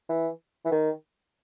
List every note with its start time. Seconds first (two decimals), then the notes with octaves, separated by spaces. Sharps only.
0.09 E3
0.65 E3
0.71 D#3